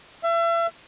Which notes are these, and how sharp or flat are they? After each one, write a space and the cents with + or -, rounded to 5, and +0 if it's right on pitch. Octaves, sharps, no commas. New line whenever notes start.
E5 +35